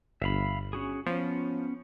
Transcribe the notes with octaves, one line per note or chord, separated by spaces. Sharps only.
G1 E5 F5 B5
C#4 F#4 G#4
F3 B3 C#4